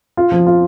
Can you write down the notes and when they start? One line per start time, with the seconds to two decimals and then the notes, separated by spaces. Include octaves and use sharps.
0.17 F4
0.32 F3
0.47 F4